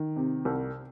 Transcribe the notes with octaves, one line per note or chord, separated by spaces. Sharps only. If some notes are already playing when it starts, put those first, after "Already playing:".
Already playing: D#3
C3
C2